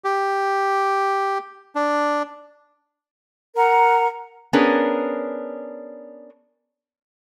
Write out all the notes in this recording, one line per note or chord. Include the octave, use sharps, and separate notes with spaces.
G4
D4
A#4 F#5 A#5
B3 C#4 D4 G#4 A#4